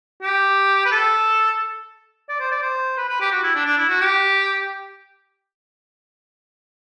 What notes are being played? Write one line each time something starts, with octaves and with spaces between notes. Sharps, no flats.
G4
B4
A4
D5
C5
D5
C5
B4
B4
G4
F#4
E4
D4
D4
E4
F#4
G4